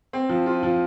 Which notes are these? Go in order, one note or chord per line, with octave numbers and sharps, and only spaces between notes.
C4
F3
F4
F3